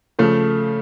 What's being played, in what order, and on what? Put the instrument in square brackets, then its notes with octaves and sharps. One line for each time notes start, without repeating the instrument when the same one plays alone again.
[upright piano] C#3 F3 [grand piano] A3